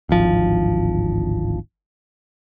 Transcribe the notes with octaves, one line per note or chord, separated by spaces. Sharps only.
D1 G#1 F3